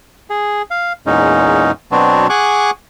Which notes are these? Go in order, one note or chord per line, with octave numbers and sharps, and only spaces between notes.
G#4
F5
E2 A#2 G#3 C#4 D#4
B2 F#3 B3 C4 D4 F#4
G#4 F#5 G#5 C#6 D6 F#6